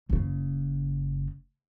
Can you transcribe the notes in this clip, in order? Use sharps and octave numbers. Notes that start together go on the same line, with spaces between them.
F#1 C#3